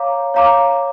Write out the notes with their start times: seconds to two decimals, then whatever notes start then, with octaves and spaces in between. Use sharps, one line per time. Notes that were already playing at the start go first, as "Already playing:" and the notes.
Already playing: C#5 F5 A#5 D6
0.34 C#5 F5 A#5 D6